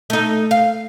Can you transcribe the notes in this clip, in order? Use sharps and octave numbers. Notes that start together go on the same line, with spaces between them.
A3 D#4
F5